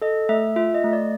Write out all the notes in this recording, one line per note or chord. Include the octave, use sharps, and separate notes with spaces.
A4 D#5
A3 E5
F4 E5
D#5
A3
D5